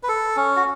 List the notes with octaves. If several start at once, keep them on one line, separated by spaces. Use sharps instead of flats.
B4
A4
C#4
F#4